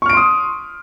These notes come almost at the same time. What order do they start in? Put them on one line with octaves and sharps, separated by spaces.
C#6 F6 D7 C6 D#6